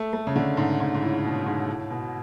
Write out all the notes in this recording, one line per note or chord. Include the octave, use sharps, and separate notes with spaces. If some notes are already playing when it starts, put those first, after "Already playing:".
Already playing: A3
A3
C#3
D3
G#2
G#2
G#2
A2
B2
G#2
A2
B2